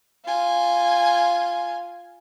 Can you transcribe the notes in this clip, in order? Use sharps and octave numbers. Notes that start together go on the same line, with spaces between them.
F4 G#5